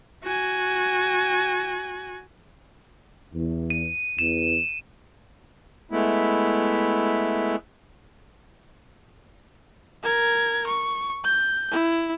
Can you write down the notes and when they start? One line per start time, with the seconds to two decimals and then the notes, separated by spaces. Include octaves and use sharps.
0.23 F#4 G#5
3.34 E2
3.70 D#7
4.19 E2 E7
5.91 G#3 A3 B3 E4
10.03 A#4 G#6
10.67 C#6
11.24 G6
11.71 E4